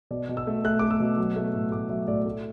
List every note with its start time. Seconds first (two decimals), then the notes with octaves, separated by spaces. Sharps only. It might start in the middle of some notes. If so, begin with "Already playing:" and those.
0.11 B2 D5
0.29 B2
0.37 E6
0.47 A3
0.64 A3 F#6
0.79 A3 D6
0.91 E6
1.00 B2
1.18 F#3
1.36 A3
1.54 A2
1.71 A2 D6
1.89 F#3 E5
2.08 A2 D5
2.25 A3